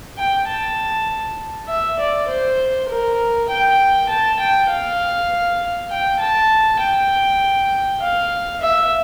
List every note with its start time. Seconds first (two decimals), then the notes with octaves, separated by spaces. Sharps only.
0.18 G5
0.48 A5
1.68 E5
1.99 D5
2.28 C5
2.89 A#4
3.49 G5
4.09 A5
4.39 G5
4.69 F5
5.90 G5
6.19 A5
6.79 G5
8.00 F5
8.61 E5